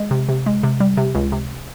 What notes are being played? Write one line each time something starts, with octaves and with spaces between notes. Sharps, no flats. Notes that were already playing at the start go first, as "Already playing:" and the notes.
Already playing: G#3
C3
C3
G#3
C3
G3
C3
C#2
C3